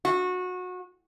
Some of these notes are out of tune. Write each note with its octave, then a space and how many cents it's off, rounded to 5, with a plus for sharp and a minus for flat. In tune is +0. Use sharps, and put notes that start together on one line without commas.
F#4 -25